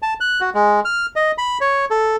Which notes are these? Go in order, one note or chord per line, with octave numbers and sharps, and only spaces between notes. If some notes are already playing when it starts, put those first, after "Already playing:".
A5
F#6
F#4
G#3
F6
D#5
B5
C#5
A4